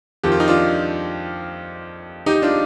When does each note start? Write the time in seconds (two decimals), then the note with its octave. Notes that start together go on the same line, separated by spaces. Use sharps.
0.23 F2 D#3 G4
0.32 F4
0.40 D#4
0.48 D4 F4
2.26 D#4 G4
2.42 D4 F4